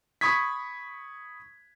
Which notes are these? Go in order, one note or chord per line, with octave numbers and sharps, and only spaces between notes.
B5 C#6 D#6 G#6 B6